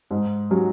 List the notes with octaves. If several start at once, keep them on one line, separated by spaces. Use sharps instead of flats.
G#2
F#3 C#4 F#4